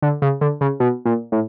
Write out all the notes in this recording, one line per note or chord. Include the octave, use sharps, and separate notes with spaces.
D3
C#3
D3
C#3
B2
A#2
A2